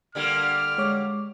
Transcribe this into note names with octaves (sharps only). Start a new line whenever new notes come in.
D3 G3 A#3 F6
G#3 C#5 D6